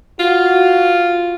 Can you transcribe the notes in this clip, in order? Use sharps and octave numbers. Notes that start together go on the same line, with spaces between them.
F4 F#4